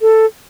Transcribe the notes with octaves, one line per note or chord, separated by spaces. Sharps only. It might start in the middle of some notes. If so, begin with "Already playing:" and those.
A4